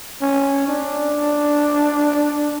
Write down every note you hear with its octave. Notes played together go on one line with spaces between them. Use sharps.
C#4
D4